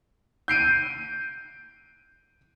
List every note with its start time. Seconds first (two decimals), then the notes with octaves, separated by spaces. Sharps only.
0.48 G6 C7 D7 D#7